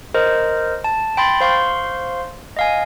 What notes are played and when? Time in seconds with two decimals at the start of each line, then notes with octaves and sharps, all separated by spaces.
0.15 A#4 C5 D#5
0.84 A5
1.17 G5 B5 C6 A6
1.41 C5 F5 C6 C#6
2.56 D#5 F5 G#5